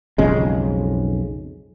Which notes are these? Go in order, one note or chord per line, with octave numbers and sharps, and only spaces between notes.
B1 F2 C#3 G#3